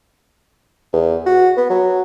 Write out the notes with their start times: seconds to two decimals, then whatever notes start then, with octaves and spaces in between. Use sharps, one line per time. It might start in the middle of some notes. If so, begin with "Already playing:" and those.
0.93 E2
1.26 F#4
1.57 B3
1.70 F#3